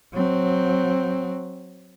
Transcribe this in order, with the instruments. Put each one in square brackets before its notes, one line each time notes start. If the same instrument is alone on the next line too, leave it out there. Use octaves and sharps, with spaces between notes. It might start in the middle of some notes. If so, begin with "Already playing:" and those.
[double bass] F#3 C4